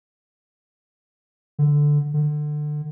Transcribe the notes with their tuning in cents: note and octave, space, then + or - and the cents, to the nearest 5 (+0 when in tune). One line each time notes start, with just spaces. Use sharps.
D3 +0
D3 +25